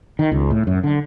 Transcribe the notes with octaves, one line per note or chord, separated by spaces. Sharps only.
D#3
C#2
A2
F#2
D3